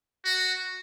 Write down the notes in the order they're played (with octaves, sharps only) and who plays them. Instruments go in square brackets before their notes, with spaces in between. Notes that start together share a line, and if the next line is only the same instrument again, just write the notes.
[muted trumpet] F#4